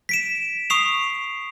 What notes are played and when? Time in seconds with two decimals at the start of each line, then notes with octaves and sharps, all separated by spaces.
0.09 B6 D7 E7
0.70 C#6 D#6 C7 F7